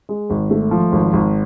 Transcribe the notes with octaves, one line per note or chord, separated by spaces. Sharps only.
G#3
G#1
A3
F3
G#1
G#1